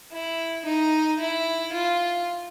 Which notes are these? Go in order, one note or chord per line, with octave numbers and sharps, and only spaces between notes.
E4
D#4
E4
F4